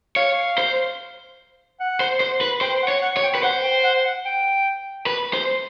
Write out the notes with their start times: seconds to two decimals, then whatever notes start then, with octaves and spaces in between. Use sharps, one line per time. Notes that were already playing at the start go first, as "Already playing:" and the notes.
0.16 C#5 F5
0.58 C5
1.80 F#5
2.00 C5
2.20 C5
2.41 B4
2.61 C5 G5
2.83 F#5
2.88 C#5
3.02 F#5
3.17 C#5
3.23 G5
3.35 B4
3.43 C5 F#5
3.63 G5
3.84 F#5
4.05 F#5
4.25 G5
5.06 B4
5.34 C5